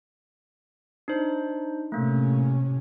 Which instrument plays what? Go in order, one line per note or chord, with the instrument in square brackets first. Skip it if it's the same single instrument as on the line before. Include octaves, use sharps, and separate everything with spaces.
[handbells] D4 D#4 C5
[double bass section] A2 C3 C#4 [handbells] A3 A#3